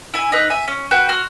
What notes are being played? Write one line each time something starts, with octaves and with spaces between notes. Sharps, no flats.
E4 G#5
D#4 B4
E5 G#5
C#4
F#4 B4 G5 G6
F#4 C6 F6